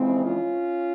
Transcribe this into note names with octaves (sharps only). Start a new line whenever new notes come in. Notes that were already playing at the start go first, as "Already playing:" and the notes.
Already playing: F2 C#3 E3 G#3 C4
C#4 F4